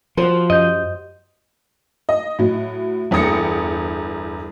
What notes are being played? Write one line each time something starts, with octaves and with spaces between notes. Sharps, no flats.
F3 F#4 C5
F#2 G4 D#5 G6
D#5
A2 F#3
G1 E2 G5 D#6 A#6 C#7